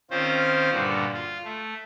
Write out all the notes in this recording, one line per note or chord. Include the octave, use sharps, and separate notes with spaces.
D#3 C4 C#4 F4 C5
G2 A#2 D3 F#4
F4
A3